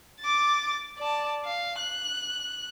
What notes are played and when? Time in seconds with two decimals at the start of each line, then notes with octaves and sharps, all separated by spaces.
0.20 D6 A6
0.98 D5 A5
1.45 F5
1.79 F#6